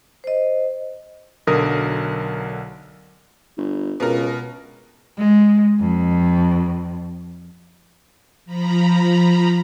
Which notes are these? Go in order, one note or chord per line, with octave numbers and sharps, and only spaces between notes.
C5 D#5
B1 D3 F#3 A#4 D#6
G1
C#2 B2 A#4
G#3
F2
F3 A#5 B5